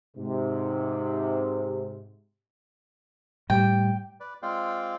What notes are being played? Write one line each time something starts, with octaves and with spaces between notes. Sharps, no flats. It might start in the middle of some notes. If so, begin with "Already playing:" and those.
G#2 C3
A2 G3 G5
B4 D5
G#3 C4 F4 D5 F5 G5